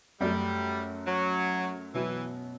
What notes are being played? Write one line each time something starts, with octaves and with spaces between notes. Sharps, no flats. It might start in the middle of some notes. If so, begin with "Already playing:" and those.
F#2 F#3 G3 A3
F#3
B2 E3 F#3 B3 F#4